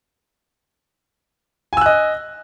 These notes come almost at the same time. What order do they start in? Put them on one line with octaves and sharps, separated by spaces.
G#5 E6 F#6 D#5